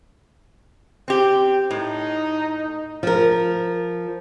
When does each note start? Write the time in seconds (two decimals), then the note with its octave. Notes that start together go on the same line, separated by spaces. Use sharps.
1.08 C4 G4
1.71 A2 D#4
3.03 F3 A#4